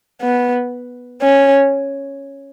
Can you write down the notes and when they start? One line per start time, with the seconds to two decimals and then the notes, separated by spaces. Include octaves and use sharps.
0.22 B3
1.22 C#4